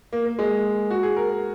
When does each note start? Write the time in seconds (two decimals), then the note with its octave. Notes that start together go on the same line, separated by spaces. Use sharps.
0.13 A#3
0.26 A#3
0.39 G#3
0.90 F#4
1.03 G#4
1.16 A#4
1.29 A#4